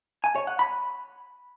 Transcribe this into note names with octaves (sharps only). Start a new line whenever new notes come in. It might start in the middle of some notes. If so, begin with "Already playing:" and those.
G#5
C#5
F#5
B5